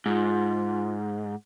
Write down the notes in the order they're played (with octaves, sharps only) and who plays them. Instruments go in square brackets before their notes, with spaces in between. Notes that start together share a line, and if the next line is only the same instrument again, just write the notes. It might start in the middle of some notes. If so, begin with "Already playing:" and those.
[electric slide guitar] G#2 [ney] F4